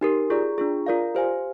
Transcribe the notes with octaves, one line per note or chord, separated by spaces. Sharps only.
D#4 G4 A#4
F4 G#4 D5
D4 F4 G#4
F4 A#4 D5 F5
G4 C5 F5 G#5